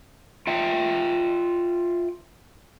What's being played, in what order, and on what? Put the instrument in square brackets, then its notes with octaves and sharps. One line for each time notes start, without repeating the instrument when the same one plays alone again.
[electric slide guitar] F4 E5 G5